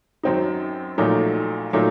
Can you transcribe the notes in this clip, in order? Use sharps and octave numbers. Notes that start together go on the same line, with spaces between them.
F#2 F#3 C4 D#4
A#1 A#2 F#3 A3 D#4
A#2 F#3 A3 D#4